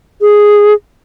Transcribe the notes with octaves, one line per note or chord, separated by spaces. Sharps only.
G#4